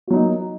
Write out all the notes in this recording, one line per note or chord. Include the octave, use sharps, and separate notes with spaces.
F#3 A#3 D#4 F#4